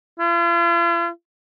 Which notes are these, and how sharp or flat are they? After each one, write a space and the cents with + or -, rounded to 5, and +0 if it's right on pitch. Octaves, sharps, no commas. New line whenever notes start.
F4 -45